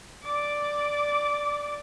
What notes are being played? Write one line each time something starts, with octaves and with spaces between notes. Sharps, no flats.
D5 D6